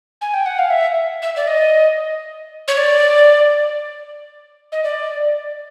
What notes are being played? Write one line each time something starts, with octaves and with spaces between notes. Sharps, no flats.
G#5
G5
F#5
F5
E5
E5
D5
D#5
C#5
D5
D#5
D5